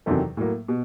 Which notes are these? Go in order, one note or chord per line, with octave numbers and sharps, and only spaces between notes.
E2 C3 D#3 F#3 A4
A2 F#3 A#3
B2